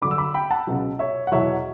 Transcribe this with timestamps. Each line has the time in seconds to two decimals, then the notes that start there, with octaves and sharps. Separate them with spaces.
0.01 G2 D3 F#3 B5 D6
0.11 E6
0.18 B5 D6
0.34 G5 B5
0.51 F#5 A5
0.67 C#2 B2 F#3
0.99 C#5 E5
1.27 F#5
1.32 E2 B2 F#3 C#5 E5